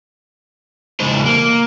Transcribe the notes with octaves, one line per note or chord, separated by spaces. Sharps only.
E2 C#3 G#3 D#4 C5
A#3